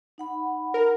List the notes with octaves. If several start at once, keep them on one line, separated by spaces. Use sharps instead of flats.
D#4 F#5 B5
A#4